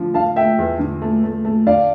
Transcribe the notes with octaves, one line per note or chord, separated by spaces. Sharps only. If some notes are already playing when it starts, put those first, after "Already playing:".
Already playing: D3 F3
D3 F5 A5
A3 E5 G5
E2
D3
A3
A3
A3
D3 D5 F5